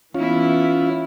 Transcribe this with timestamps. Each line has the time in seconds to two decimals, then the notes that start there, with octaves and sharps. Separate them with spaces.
0.14 E3 B3 C#4 E4 F4